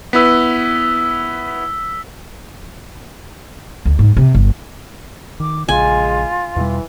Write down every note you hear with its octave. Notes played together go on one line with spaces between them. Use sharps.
B3 E4 B4 E6 B6
D2
G#2
C3
G1
D#3 D6
A#1 C#3 G#3 F4 G#5
E2 B2 E3 G3